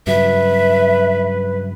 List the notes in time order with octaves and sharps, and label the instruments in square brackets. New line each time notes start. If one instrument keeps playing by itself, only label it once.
[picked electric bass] G2 C#3 F#3 [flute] B4 [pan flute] E5